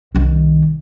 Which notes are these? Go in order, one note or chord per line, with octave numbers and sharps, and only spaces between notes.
C2 D#3